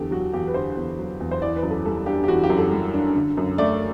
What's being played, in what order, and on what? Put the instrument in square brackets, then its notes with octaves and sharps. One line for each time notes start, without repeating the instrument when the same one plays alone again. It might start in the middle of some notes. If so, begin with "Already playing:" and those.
Already playing: [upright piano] E2 D3 G4 A4
F#3 F#4
E2 G4
B4
D3 C5
E2
F#3
E2
C5
E3 D5
B4
F#2
A4
G3 A4
D4 G4
G4
E3 F#4
G4
F#2
A4
G3
D4
D3
F#2
A3 D5